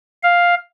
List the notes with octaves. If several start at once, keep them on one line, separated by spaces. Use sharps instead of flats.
F5